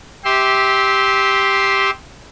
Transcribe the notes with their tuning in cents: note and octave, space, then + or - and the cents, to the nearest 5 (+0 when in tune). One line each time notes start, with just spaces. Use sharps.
G4 +0 E5 -25 C6 +0